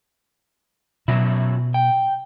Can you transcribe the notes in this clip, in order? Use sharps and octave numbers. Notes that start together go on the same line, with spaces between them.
F#2 B2 F#3 E4
G5